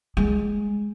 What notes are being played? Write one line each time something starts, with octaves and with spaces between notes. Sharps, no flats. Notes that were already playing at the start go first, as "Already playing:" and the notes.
G#3